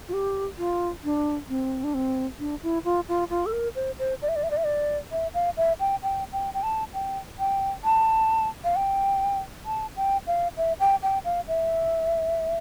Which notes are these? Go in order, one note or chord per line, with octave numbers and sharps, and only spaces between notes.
F4
G4
F4
D4
C4
D4
C4
D4
E4
F4
F4
F4
A4
A#4
C5
C5
D5
E5
D5
E5
D5
E5
D5
E5
F5
E5
G5
G5
G5
G5
A5
G5
G5
A5
F5
G5
A5
G5
F5
E5
G5
G5
F5
E5